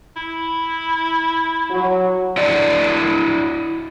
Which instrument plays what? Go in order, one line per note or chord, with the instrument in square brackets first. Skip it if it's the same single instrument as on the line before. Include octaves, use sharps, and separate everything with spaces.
[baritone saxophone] E4
[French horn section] F#3
[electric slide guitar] D4 E4 D5 D#5 F#5